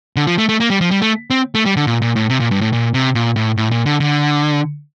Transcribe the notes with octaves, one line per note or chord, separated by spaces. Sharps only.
D3
F3
A3
A3
A#3
G3
F3
G3
A3
C4
A3
G3
D3
A#2
A#2
A2
C3
A#2
G2
A2
A#2
C3
A#2
A2
A2
A#2
D3
D3